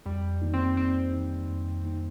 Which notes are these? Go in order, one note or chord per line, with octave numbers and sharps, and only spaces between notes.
F2 G3
D#3 A#3 D#4
C4
F2 C4
D#3 A#3 D#4
F2
D#3 A#3 D#4